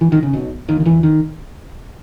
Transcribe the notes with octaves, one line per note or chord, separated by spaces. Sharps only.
E3
D#3
C#3
B1 B2
D#2 D#3
D#3
E2 E3
D#3